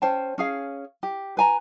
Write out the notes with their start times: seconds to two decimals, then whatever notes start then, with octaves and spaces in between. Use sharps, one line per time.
0.02 C#4 C5 G5 A5
0.38 C#4 G#4 F5
1.03 G4
1.37 B4 G#5 A#5